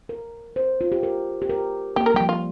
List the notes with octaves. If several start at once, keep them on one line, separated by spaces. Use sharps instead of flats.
A#4
C5
F4
G4
A#4
G4
A#4
A#3 G4
A#4
G3 G4
F3
F4